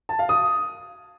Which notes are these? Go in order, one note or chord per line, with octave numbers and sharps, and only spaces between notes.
A5
F5
D#6